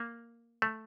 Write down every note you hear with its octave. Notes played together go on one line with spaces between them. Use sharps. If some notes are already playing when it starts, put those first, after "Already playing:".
Already playing: A#3
A3